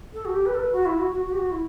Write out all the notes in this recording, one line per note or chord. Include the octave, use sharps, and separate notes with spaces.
A4
F#4
G4
B4
A4
B4
F#4
E4
F#4
F#4
F#4
G4
F#4
E4